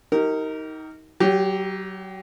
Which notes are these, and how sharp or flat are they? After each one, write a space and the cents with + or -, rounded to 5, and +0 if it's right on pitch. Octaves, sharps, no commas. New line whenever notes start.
D#4 +25 G4 -35 A#4 -15
F#3 +30 G4 +0